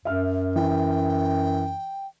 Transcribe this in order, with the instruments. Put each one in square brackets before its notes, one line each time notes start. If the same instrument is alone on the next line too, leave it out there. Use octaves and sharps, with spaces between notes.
[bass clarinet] F#2 [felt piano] E5 F6
[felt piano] E3 [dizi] G5